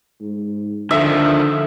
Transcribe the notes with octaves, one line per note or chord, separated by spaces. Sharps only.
G#2
D3 D#3 F3 E5